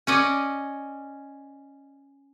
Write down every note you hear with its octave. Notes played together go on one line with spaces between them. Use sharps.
C#4 D5 D#5